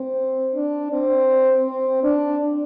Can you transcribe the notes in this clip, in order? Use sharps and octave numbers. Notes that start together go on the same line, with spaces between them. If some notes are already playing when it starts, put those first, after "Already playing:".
Already playing: C4
D4
C4
C4
D4